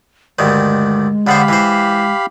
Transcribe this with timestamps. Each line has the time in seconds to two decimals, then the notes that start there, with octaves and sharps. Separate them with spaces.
0.39 D2 G2 D#3 G#3
1.27 D3 B3 G4 C5 F5 B5
1.48 E3 C5